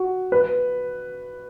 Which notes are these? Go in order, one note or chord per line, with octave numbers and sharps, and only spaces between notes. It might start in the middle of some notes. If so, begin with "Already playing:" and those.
Already playing: F#4
B4